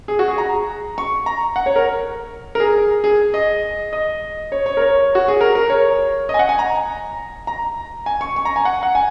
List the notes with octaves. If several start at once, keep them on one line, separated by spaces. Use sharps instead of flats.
G#4
F#4
G#4
A#5
C#6
A#5
F#5
C#5
A#4
A#4
G#4
G#4
D#5
D#5
C#5
C#5
A#4
C#5
F#4
G#4
A#4
A#4
C#5
D#5
G#5
F#5
G#5
A#5
A#5
G#5
C#6
C#6
A#5
G#5
F#5
F#5
G#5